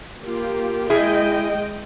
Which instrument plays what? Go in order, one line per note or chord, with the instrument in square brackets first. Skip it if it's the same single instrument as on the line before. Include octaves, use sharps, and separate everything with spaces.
[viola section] A#3 F4 G4
[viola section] G#3 D#5 G5 [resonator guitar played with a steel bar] E4 G#4